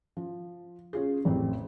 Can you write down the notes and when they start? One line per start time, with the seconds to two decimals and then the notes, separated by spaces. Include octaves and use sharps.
0.17 F3
0.93 C#4 F4 G#4
1.25 A1 F2 C3 C4